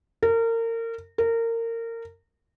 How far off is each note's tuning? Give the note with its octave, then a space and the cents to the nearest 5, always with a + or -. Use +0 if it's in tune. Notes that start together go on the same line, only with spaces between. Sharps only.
A#4 -30
A#4 -25